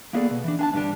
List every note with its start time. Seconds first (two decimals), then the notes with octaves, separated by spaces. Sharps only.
0.13 A#3 B3 E4 G#4 A4 D5
0.31 B2
0.44 E3 D4
0.59 D4 G#5 A5
0.74 G2 D3 G3 D4